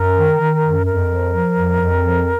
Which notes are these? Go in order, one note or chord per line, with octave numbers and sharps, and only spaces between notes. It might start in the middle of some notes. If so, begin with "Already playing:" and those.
Already playing: F#2 A#4
D#3
D#3
F#2
F2 A#4
F3
F3
F2
F2
F3